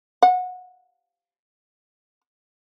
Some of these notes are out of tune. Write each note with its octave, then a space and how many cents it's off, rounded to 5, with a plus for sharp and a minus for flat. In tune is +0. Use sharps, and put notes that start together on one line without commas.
F#5 -20